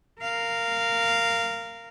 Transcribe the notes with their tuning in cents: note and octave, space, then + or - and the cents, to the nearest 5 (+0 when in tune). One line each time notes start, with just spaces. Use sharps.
A#4 -10 F5 -10